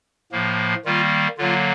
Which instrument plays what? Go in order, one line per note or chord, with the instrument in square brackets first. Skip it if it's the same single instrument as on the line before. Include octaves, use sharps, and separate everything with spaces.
[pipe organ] A2 F3 A#3
D#3 G3 A#3 F4
D3 F#3 A#3 F4